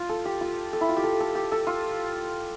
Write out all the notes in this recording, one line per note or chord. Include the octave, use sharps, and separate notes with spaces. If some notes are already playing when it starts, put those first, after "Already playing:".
Already playing: F4
A4
G4
F4
A4
E4
F4
G4
A4
A4
G4
A4
F4